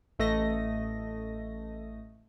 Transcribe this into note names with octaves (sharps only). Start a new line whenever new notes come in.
A1 A3 D#5 A#6